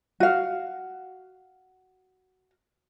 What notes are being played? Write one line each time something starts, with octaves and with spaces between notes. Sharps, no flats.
F#4 F5